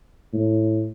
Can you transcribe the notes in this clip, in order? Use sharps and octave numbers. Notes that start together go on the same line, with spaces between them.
A2